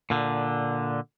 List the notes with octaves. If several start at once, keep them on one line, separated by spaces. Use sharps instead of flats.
A#2 D3